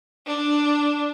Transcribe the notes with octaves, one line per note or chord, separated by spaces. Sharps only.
D4